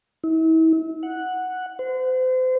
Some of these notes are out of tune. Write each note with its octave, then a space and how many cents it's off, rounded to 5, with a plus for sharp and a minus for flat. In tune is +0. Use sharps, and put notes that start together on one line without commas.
E4 -40
F#5 -5
C5 -35